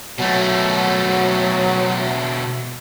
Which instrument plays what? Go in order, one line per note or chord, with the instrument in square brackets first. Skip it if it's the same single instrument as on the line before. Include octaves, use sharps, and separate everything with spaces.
[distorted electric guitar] B2 A3 [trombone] F#3